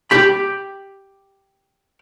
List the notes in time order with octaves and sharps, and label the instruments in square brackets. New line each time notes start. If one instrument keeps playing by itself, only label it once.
[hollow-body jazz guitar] G4 B5